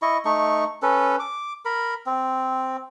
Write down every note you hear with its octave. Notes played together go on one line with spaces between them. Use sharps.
E4 D#5 C#6
A3 D#4 C#6
C#4 A4 B4
D6
A#4 B5
C4